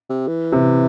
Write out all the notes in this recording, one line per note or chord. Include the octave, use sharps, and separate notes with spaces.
C3
E3
C3